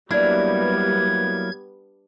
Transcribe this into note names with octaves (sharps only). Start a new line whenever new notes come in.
F#3 G3 A#3 B3 D4 E4 G#6